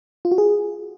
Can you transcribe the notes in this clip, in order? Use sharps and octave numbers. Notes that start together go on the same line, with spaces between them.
F4
F#4
G#4